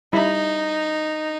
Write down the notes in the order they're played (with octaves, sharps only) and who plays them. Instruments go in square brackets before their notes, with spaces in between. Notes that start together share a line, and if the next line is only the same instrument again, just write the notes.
[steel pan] G3 E4 B5 [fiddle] D#4